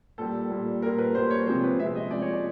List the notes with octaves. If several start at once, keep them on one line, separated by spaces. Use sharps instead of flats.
A#2 G3 A4
A#2 G3
A#2 G3 A#4
B4
A#2 G3 C5
C#5
C3 F3 G#3 C5
B4
C3 F3 G#3 E5
D#5
C3 F3 G#3 D5
C#5
D5